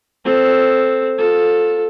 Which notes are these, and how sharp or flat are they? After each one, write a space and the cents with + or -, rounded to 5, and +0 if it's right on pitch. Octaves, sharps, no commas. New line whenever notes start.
C4 +0 A4 +0
F4 +25 A4 +0